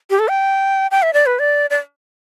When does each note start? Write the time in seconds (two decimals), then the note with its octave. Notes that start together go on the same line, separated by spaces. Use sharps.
0.10 G4
0.19 A4
0.28 G5
0.91 G5
1.02 E5
1.14 D5
1.26 B4
1.39 D5
1.70 D5